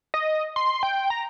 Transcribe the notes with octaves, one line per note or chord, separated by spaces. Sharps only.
D#5
C6
G5
A#5